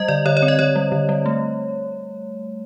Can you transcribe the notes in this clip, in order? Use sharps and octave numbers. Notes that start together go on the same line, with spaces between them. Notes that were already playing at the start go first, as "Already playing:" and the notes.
Already playing: G3 D#5
D3 D5
D3 C#5
C#5
C4
D#5
D3 C#5
G3
D3
G3
A3